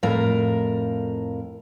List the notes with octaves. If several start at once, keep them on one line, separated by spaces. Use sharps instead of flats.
F2 A2 A#4 F5